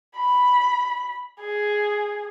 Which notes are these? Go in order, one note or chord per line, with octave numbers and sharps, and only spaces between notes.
B5
G#4